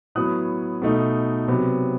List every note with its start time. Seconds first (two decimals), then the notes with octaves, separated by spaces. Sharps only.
0.15 A2 F#3 B3 D#6 F#6
0.82 B2 A3 D#4
1.48 C3 F#3 B3